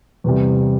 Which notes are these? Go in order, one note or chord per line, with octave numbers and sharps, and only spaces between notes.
E2 C3 G3